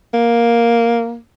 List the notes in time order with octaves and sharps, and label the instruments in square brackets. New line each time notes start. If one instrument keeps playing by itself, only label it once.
[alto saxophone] A#3